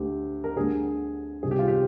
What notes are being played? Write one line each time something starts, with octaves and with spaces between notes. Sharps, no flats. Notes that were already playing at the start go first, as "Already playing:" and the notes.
Already playing: D2 D3 G4
A#4
D2 D3 G#4
C2 C3 D#3 G#4
G4
F4
G4